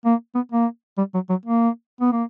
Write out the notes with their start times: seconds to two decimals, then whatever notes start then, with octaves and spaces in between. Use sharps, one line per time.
0.05 A#3
0.35 B3
0.52 A#3
0.97 G3
1.14 F#3
1.29 F#3
1.45 A#3
2.01 B3
2.12 A#3